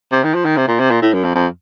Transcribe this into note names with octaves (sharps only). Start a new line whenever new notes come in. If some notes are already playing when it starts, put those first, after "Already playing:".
C3
D#3
F3
D#3
C3
A#2
C3
A#2
A2
F#2
F2
F2